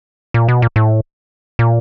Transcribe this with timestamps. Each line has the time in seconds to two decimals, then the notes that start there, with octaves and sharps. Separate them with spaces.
0.34 A#2
0.48 B2
0.62 A#2
0.76 A2
1.59 A#2